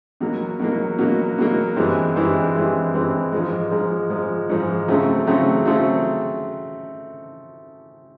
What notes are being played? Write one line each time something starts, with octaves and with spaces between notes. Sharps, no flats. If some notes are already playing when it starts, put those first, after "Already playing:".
B2 F#3 A#3
B2 F#3 A#3
B2 F#3 A#3
B2 F#3 A#3
G2 E3 G#3 C4
G2 E3 G#3 C4
G2 E3 G#3 C4
G2 E3 G#3 C4
G#2 F3 G#3
G#2 F3 G#3
G#2 F3 G#3
G#2 F3 G#3
C#3 F#3 A3 C4
C#3 F#3 A3 C4
C#3 F#3 A3 C4